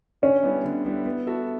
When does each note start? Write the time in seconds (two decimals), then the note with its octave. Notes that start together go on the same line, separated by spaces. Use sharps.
0.22 D3 C#4
0.43 G3 B3 E4
0.63 D3
0.85 G3 B3 E4
1.06 B3
1.27 F#4 A4 E5